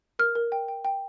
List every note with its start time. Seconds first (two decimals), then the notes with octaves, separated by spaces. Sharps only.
0.19 A#4 F6
0.35 A#4
0.52 G5
0.68 G5
0.85 G5